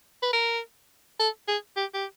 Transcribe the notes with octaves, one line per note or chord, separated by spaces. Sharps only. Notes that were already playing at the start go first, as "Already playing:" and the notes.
B4
A#4
A4
G#4
G4
G4